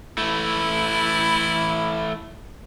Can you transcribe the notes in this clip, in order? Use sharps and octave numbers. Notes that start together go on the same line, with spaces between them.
E3 A3 E4